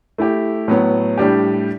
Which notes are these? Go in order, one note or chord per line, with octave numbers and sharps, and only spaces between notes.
A3 E4 G4
A2 F#3 B3
A2 G3 D4 G4